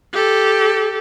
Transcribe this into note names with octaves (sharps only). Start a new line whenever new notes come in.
G4 A4